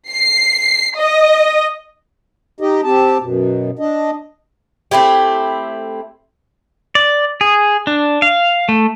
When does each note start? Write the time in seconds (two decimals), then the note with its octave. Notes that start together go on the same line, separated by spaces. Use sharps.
0.10 C7
0.98 D#5
2.60 D#4 G4 D#5
2.84 C4 G4 A5
3.21 F#2 B2
3.79 D4 D#5
4.91 A3 C4 E4 G4
6.95 D5
7.41 G#4
7.87 D4
8.22 F5
8.69 A3